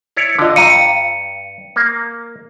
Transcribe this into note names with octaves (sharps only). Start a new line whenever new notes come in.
E4 C#5 D5
D3 D4 F4 D#5
G2 F5 G5 A#5 C#7 D#7
A#3